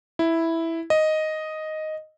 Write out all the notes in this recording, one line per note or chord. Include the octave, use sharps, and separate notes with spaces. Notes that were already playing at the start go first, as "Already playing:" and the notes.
E4
D#5